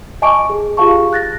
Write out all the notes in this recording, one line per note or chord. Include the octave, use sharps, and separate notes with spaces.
D#5 G#5 A5 C#6 D6 D7
G#4
F4 G4 G#4 F5 A5 C#6
F#6 A6 A#6